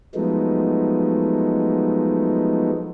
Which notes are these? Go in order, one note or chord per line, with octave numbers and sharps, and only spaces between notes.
F3 F#3 G#3 A3 B3 D#4